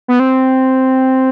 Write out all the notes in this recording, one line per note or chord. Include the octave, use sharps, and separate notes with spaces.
B3
C4